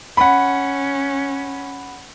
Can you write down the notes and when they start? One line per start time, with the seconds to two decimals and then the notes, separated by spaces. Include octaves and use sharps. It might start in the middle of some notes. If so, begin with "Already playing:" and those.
0.17 C#4 F#5 B5